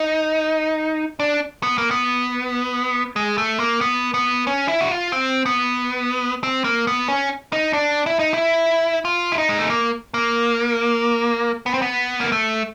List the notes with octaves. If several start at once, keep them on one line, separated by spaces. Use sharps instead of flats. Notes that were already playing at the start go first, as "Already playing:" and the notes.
Already playing: D#4
D4
B3
A#3
B3
G#3
A3
A#3
B3
B3
C#4
E4
F#4
F4
C4
B3
C4
A#3
B3
C#4
D#4
D4
E4
D#4
E4
F4
E4
D#4
G#3
A3
A#3
A#3
B3
C4
B3
A#3
A3